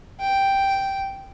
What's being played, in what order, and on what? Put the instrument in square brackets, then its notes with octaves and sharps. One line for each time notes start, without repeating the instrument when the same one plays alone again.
[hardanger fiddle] G5